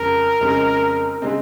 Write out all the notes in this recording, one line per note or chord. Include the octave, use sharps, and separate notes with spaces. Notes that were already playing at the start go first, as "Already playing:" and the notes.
Already playing: F2 C#3 G#3 A#4
F2 C#3 G#3 C4 D#4
C#3 G#3 C4 D#4